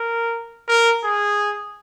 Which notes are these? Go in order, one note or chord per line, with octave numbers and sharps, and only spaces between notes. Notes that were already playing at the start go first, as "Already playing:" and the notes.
Already playing: A#4
A#4
G#4